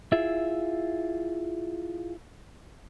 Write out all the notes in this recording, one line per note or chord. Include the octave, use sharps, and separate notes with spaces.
E4 F4 G#4 E5